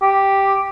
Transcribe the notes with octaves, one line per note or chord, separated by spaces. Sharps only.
G4